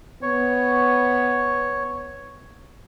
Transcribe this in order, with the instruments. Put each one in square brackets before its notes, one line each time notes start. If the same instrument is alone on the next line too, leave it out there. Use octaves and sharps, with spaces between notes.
[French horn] B3 [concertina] C#5